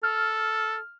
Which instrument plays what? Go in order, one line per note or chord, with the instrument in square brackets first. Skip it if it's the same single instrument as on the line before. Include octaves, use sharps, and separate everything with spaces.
[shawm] A4 [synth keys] F6